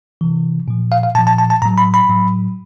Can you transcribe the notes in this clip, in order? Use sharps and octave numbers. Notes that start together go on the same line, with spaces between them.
C3 E3
A#2 F3
F5
F5
A#2 F3 A5
A5
A5
A5
A2 F#3 A#5
B5
B5
A2 F#3